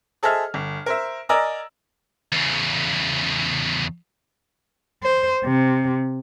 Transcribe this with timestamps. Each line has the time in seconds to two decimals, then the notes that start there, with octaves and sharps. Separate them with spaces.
0.23 G#4 A4 C5 D#5 E5 F6
0.54 G1
0.86 A#4 C5 E5
1.29 A#4 D5 D#5 G#5 A#5 E6
2.32 E2 C#3
5.03 C5
5.44 C3